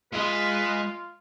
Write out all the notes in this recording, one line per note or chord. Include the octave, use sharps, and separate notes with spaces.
G#3 F4 B4 D#5